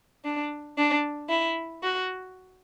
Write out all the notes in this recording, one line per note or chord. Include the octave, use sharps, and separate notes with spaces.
D4
D4
E4
F#4